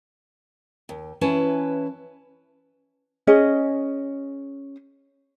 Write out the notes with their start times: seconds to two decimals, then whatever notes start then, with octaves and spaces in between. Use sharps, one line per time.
0.89 D#2
1.21 E3 C#4 E4 B4 A5
3.27 C#4 G#4 D#5